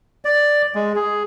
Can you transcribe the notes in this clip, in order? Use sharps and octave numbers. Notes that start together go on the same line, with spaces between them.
D5
G#3
G#4